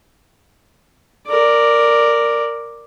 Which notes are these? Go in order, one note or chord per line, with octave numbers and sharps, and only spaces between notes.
A#4 D5